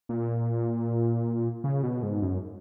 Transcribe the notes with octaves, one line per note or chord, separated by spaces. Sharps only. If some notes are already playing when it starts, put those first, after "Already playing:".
A#2
C#3
B2
G#2
F#2